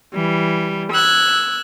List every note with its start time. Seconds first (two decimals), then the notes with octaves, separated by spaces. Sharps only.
0.12 E3 G3
0.91 E6 F#6 G#6